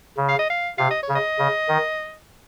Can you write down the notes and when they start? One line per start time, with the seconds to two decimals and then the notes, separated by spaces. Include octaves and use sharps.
0.17 C#3
0.29 F5
0.39 D#5
0.50 F5
0.78 C3 F5
0.91 D#5
1.03 C#5
1.09 C#3
1.15 D#5
1.39 C#3
1.68 D#3